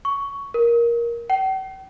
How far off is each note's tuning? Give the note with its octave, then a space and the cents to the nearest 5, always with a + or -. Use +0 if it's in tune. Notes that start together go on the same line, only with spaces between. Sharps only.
C#6 +10
A#4 +10
G5 -45